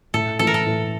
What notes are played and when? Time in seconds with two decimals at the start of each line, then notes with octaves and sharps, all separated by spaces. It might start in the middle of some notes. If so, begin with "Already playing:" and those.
0.14 A2 A4
0.39 E3 A3 E4 A4
0.47 A#4
0.54 A4
0.66 A2